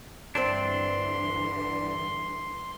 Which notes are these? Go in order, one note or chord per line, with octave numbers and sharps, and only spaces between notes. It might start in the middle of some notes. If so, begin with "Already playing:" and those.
G2 D3 E3 C4 D4 D5 E5 C6